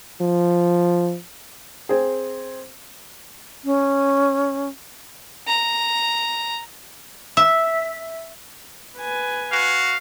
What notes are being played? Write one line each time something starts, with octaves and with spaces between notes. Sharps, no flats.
F3
C4 G#4
C#4
A#5
E5
B4 G#5
F#4 F5